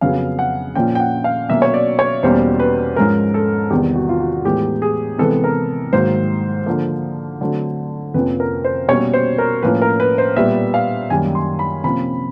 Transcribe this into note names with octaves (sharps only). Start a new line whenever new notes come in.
F2 C#3 F#3 B3 F5
F#5
A#2 F3 A#3 C#4 G5
G5
F#5
F5
B2 F#3 A#3 C#4 E5
C#5
D5
C#5
E2 B2 G3 A#3 C#4 C5
B4
G#2 F3 G#3 C#4 A#4
A4
E2 C3 D#3 G3 B3 G4
F#4
F4
F#4
A2 E3 G#3 B3 G4
G#4
C3 E3 G#3 B3 A4
A#4
G#2 D#3 F#3 A#3 C5
D3 F3 A#3
D3 F#3 A3 C4
F2 C3 F3 A#3 C#4 B4
A#4
C5
B2 G3 A#3 C#4 C#5
C5
A#4
A2 F3 A#3 C#4 B4
A#4
B4
C5
A#2 G3 B3 E5
F5
F#2 D#3 G3 A#3 G#5
C6
B5
C3 F3 A#3 C#4 B5